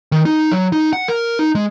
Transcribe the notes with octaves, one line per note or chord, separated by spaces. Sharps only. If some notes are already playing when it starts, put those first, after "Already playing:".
D#3
D#4
F#3
D#4
F#5
A#4
D#4
G#3